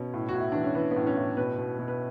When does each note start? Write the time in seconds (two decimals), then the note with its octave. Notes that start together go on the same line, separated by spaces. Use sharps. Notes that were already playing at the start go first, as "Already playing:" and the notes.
Already playing: B2 C#4
0.14 A2
0.29 F#4
0.34 A2
0.40 E4
0.52 E3 D4
0.64 C#4
0.75 E3 B3
0.91 B3
0.96 A2
1.07 C#4
1.17 A2
1.37 B2 B4
1.58 B2
1.79 B2
1.88 B4